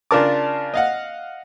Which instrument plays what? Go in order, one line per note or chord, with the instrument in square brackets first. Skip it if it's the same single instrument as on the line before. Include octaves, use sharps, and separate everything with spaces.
[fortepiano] C#3 D4 F4 A#4 A5 D6
D#5 F5 F#5